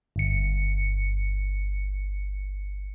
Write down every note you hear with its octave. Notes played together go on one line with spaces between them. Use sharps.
G1 C#7